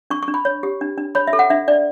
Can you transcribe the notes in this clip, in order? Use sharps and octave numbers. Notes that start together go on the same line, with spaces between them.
D4 C#6
C#6
D4
B5
C#5
G4
D4
D4
C#5 B5
E5
A4
F#5
D4 E5
D4 D5